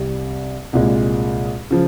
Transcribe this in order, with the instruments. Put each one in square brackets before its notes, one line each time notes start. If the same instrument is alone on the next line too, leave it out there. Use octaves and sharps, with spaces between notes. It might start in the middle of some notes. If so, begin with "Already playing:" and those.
Already playing: [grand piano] C2 C3 G3
C2 A#2 G#3
C#3 F3